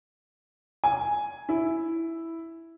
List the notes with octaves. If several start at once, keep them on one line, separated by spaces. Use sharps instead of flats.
G#5
E4